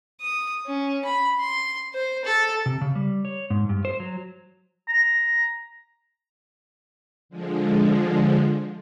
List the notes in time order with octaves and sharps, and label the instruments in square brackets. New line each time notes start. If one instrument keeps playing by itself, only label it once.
[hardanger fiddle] D#6
C#4
B5
C6
C5
A4
[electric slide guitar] C3
C#3
G3
C#5
G#2
G2
C5
F#3
[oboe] A#5
[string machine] D3 F3 G#3